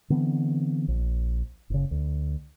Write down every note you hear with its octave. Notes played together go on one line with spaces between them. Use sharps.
D3 E3 B3 C4
A#1
F#1 C#3
D2